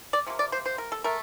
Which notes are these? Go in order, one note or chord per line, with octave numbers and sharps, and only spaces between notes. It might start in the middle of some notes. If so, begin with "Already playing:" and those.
D5
C3 F3 A#3
D5
C5
C5
A#4
A4
A3 A#4